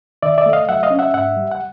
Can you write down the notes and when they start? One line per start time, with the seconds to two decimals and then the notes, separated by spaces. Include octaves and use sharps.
0.22 D#3 D5 E5
0.38 D5 E5
0.46 A3
0.53 D#5 F5
0.68 F#3 E5 F#5
0.83 D#5 F5
0.91 C#4
0.99 E5 F#5
1.14 G#2 E5 F#5
1.36 G3
1.51 F#5